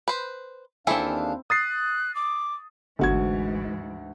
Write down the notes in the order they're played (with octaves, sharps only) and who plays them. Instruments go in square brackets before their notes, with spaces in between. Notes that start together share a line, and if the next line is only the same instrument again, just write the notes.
[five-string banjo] B4 C5
[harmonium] D#2 D4 F5 [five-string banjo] E3 G#4 A4 [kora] C4 E4
[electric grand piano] D#6 A6 C7 [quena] F#6
[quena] D6
[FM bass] G1 [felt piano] D2 F#4 G#6 [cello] G#2 E3